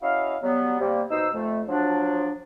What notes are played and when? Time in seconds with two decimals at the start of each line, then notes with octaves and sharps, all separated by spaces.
0.02 C#4 E4 F#4 D#5 F5
0.43 F#3 G3 B3
0.80 C3 G3 A#3
1.11 B2 D#4 C5 E6
1.34 F2 A3
1.68 F3 F#3 D4